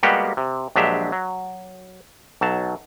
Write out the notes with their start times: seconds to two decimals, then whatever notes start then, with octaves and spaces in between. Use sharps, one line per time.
0.03 G3 G#3 A#3 B3 F#4 G4
0.37 C3
0.76 A#1 F#3 G#3 D4 G4 E5
1.12 F#3
2.41 B1 F#3 A5